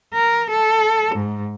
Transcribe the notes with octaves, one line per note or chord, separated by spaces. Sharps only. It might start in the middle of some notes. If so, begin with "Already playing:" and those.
A#4
A4
G#2